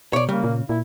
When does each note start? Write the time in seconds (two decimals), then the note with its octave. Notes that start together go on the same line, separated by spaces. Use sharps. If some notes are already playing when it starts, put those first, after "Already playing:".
0.13 B2 C#5 D5
0.29 C#3 G3 A#3
0.44 A#2
0.69 A#2 E4